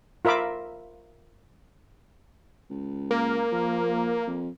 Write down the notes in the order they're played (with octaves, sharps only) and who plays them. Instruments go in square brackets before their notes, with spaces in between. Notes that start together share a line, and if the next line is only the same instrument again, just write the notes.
[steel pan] F4 A#4 E5 B5 D6
[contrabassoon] C#2
[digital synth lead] A#3
[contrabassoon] F3
F2